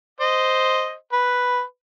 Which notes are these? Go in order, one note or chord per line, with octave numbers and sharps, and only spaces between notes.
C5 D#5
B4